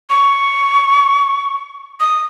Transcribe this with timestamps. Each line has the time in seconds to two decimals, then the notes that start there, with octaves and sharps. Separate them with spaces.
0.10 C#6
2.00 D#6